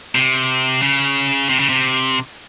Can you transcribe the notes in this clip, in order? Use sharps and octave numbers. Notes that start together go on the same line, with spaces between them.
C3
C#3
C3
C#3
C3